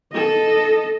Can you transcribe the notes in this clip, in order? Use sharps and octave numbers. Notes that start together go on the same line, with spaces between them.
A4 D#5